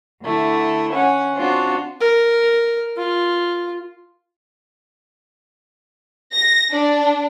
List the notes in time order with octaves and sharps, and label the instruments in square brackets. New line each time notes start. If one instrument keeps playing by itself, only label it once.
[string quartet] D3 A3 E4
C#4 F#5
C4 D4 F4 F#4
[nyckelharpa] A#4
F4
[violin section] A#6
D4